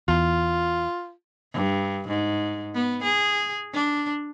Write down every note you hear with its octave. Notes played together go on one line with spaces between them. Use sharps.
E2 F4
G2
G#2
B3
G#4
D4